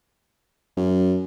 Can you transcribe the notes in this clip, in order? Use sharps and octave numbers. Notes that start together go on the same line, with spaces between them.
F#2